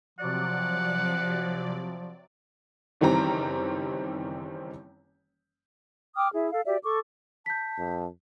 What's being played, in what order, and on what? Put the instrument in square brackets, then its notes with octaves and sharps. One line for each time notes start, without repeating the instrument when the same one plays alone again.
[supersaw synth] C3 F#3 D5 [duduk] F3 [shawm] F#5
[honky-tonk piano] F#1 D#3 E3 G3 C4 A#5
[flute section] G5 D6 D#6 F6
E4 G#4 E5
A4 F5
F#4 G4 D5 E5
A4 C#6 D6
[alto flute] A5 [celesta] G6 B6
[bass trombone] F2